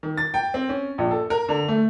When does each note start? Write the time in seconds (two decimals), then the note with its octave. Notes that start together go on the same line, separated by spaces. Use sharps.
0.03 D#3
0.18 A6
0.34 G5
0.54 C4
0.69 C#4
0.98 A#1
1.11 A4
1.30 A#4
1.49 D3
1.68 A3